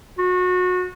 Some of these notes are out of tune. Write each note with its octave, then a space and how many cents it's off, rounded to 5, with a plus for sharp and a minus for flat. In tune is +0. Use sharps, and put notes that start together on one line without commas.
F#4 -25